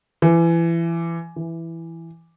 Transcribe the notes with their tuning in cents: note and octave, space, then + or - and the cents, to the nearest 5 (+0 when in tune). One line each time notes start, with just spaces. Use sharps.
E3 +25
E3 +5